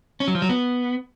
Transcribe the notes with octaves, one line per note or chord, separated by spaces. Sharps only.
C#4
F#3
F3
F#3
B3